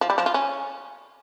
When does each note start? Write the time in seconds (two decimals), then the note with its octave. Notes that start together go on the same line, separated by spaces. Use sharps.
0.01 F3
0.10 G3
0.18 F3
0.26 F4
0.34 C#4